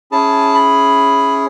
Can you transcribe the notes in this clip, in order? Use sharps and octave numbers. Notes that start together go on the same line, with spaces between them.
C#4 E4 G#4 A5
B5